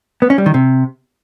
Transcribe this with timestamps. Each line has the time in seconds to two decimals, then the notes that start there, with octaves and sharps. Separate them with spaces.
0.22 B3
0.30 C#4
0.38 G3
0.46 D#3
0.54 C3